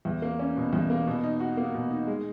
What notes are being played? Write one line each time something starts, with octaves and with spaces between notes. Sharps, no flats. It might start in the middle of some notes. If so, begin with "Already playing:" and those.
E2
A#3
C#4
B2
E2
A#3
B2
D#4
F#4
A#3
B2
D#4
G#3